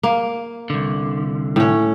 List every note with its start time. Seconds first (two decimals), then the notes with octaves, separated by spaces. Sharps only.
0.03 A#3
0.70 C2 D3
1.56 A2 C#4